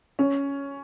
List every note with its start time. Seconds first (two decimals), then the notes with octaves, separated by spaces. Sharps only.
0.19 C#4